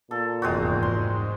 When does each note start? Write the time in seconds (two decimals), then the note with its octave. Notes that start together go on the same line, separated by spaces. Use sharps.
0.11 A#2 A4
0.42 F1 E2 G#2 G#3 C4 F#4
0.83 C6